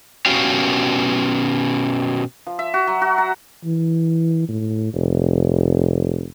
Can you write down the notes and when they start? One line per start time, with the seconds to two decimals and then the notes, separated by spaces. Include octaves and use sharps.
0.26 B2 C#4 F#4 G4 F5
2.47 F3
2.59 E5
2.74 F#4
2.87 F#3
3.02 F#4
3.18 A#5
3.65 E3
4.49 A2
4.94 F1